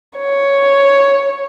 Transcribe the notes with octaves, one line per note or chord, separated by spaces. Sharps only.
C#5